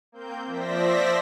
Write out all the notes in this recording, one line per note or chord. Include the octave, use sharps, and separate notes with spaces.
A#3 C4 G6
F3 C5 D5 E5 A#6 B6